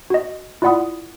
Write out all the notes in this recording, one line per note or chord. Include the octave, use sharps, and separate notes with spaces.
F#4 D#5
E4 F4 D5 F#5 B5 D#6